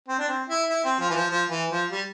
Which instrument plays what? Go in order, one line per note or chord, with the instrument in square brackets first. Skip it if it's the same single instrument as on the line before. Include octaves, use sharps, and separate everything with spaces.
[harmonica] C4
D4
C4
E4
E4
C4
F3
E3
F3
F3
E3
F3
G3